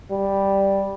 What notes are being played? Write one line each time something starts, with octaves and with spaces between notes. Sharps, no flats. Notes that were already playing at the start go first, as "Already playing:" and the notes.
G3